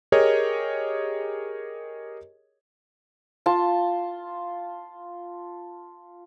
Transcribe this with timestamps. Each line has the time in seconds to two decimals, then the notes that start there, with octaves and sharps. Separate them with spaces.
0.12 G4 G#4 A#4 C#5 D#5
3.46 F4 A5